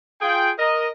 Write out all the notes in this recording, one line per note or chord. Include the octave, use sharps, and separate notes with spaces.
F4 G#4 G5
A#4 D#5